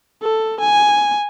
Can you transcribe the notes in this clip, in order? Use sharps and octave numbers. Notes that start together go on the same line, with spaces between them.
A4
G#5